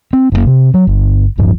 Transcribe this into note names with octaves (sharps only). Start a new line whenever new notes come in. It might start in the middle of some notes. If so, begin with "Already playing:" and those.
C4
F#1 C3 A#3
C3
F#3
G1
D1 G2 F3